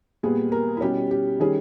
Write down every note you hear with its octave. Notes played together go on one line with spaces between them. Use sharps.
A#2 G3 B3 G#4
A#4
E4
B2 G3 C#4 G4
G4
D#3 G3 C#4 G#4